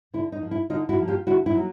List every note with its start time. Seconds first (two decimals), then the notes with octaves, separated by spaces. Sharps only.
0.14 D3 E4
0.32 D#4
0.41 F3 A#3
0.51 E4
0.70 D3 D#4 F4
0.89 E4 F#4
0.99 F3 A#3
1.08 F4 G4
1.27 D3 E4 F#4
1.46 E4
1.55 F#3 A#3